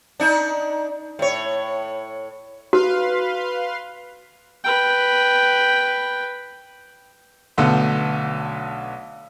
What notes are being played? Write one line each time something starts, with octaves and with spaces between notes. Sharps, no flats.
D4 D#4
A2 C#5
F#4 B4 F5 C6
B4 G5
B1 D3 A3 B3